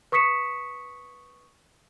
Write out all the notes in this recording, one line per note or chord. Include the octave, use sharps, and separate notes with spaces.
B4 C#6 D#6 B6 C#7 E7